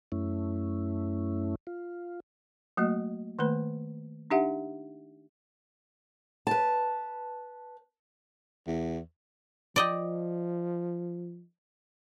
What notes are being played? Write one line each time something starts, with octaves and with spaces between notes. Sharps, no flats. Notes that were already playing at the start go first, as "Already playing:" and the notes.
F#2 A3 C#4 E4
F4
F#3 A3 A#3 F#4 D#5
D#3 A3 A#3 B4 B5
D4 D#4 G4 E5 F#5
B4 A5
E2
F3 D5 D#5 G5